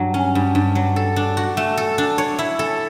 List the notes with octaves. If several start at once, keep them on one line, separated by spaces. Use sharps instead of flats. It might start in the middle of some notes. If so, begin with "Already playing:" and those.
Already playing: G2 F#3
C#4
G2
G2
F#3
A4
D4
F#4
A3
A4
D4
C#5
E4
A4